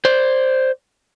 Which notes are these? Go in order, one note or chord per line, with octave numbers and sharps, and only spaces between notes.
C5 D5